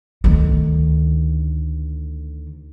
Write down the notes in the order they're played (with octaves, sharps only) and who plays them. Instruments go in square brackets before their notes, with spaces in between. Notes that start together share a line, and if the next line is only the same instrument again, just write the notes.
[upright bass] D2 D#3